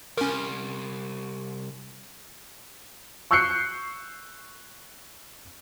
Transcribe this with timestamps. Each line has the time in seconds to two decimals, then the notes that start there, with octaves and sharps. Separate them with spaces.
0.17 C2 F2 C#4 A#4
3.31 C#6 E6 F#6 G6 C7 C#7